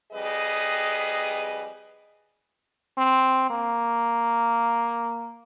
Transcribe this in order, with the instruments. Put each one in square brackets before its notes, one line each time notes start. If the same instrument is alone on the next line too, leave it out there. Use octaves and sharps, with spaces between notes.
[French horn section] F2 G3 G#4 B4 D#5
[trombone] C4
A#3